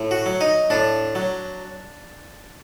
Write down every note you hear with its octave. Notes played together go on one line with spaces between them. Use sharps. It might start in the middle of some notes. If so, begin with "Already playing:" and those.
Already playing: A2
F#4
F#3
D#4
A2 D4
F#3